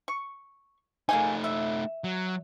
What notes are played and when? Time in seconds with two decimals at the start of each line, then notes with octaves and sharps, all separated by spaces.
0.08 C#6
1.09 A3 A#3 D#4 G#4 G#5
1.44 E5
2.04 F#3